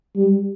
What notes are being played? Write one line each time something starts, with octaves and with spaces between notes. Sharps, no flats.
G3